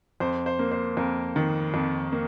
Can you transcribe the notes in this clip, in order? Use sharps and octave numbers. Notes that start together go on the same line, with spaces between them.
F2 C5
C5
A#3
C5
F2 A#4
D#3
F2
A#3